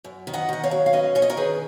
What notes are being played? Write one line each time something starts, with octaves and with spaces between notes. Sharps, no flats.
F#2
D#3
D#5 F#5
D#3 F#5
C#5 F5
F#3
F5
C#4 B4 D#5
C#4 C#5
D#5
A#4 C#5
D#3 G#4 B4